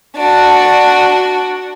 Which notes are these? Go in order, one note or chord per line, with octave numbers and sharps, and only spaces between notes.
D4 F#4